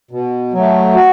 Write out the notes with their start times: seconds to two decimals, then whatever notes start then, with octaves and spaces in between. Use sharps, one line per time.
0.11 B2
0.53 F#3 A3
0.95 F#4